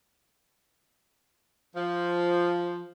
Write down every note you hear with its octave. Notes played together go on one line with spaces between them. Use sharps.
F3